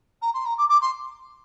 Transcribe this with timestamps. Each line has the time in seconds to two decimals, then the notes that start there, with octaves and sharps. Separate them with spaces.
0.21 A#5
0.33 C6
0.45 A#5
0.58 D6
0.69 D6
0.81 C6